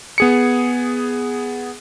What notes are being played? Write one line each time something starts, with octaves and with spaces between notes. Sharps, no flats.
B3 G#4 C#7